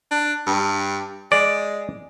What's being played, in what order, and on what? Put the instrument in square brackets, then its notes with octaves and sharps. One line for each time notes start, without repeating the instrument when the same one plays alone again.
[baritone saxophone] D4
G2
[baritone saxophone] G#3 [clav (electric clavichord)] D5